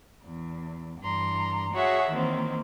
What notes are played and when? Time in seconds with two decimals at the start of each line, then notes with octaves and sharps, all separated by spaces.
0.23 E2
1.00 G2 E3 A#5 C6
1.73 F#4 G#4 C#5 E5 F#5
2.09 D#3 E3 A#3 C4